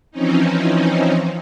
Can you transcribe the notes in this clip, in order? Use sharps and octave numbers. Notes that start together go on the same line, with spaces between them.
E3 F3 C4 C#4 D#4